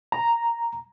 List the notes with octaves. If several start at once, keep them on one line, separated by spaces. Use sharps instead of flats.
A#5